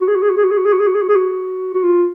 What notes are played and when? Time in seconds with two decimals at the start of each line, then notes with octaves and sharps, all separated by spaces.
0.01 F#4
0.08 G#4
0.15 F#4
0.22 G#4
0.30 F#4
0.37 G#4
0.44 F#4
0.51 G#4
0.58 F#4
0.65 G#4
0.73 F#4
0.79 G#4
0.87 F#4
0.95 G#4
1.02 F#4
1.09 G#4
1.16 F#4
1.74 F#4
1.83 F4